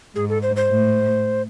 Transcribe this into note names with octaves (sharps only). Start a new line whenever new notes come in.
G#2 G#4
A4
C5
C5
A2